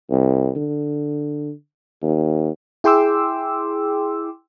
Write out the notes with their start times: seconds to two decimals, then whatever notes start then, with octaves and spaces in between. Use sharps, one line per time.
0.10 C2
0.56 D3
2.03 D#2
2.84 E4 G#4 G5 C6 D6 E6